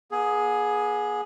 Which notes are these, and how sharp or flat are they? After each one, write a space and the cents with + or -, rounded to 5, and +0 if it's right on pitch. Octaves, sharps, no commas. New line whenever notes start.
B3 -40 G#4 +10